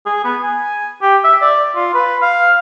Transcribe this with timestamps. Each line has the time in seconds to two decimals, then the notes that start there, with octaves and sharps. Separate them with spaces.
0.06 G#4
0.24 B3
0.43 G#5
1.02 G4
1.24 E5
1.42 D5
1.76 F4
1.94 B4
2.22 F5